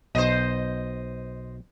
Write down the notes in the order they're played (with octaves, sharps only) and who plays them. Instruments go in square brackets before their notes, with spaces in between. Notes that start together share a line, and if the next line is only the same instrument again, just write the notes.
[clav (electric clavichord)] B1 B2 [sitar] C5 D#5